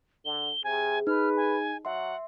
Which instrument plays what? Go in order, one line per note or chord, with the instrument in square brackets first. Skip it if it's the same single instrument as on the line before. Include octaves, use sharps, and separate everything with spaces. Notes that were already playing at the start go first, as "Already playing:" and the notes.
[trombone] D3 [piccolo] G7
[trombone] C3 [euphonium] G#4 [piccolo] G#5
[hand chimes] D#4 [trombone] B4 [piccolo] F6
[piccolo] G#5
[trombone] F#3 [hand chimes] E5 C6 [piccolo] F#5